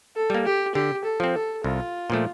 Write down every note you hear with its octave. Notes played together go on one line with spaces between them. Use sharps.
A4
G3 A#3
G4
D3 G4
A4
F3 C4
A4
C2 F4
A#2 F3 A3